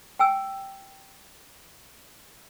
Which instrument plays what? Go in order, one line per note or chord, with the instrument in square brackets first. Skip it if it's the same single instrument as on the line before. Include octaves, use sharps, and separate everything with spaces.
[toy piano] G5 G#5 E6